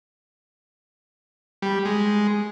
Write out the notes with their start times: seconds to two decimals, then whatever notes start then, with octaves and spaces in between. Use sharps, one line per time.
1.62 G3
1.85 G#3